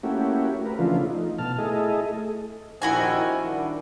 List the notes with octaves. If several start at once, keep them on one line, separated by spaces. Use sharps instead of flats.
A3 A#3 C#4 E4 F#4 G4
A#4 B4
C#3 E3 F3 A3 D4 F4
D#4
B2 A5 F6
A3 E4 G#4 A4 D#5
A#1 C3 D#3 E4 F#4 G#5
D#3 G3 D4